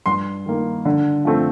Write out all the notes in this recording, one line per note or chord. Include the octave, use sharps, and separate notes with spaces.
G2 C6
D#3 A#3
D3
F3 A3 C4